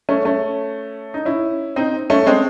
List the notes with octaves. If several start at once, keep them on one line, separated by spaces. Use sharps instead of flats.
A3 C#4
A3 C#4
D#4
C#4 E4
C4 D#4
A3 C#4
G#3 C4